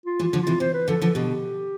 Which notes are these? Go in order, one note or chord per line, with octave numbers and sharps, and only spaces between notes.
F4
E3 G3
F4
D3 F3
C3 E3 F4
C3 C5
B4
D3 F3 A4
D3 F3 A4
B2 D3 G4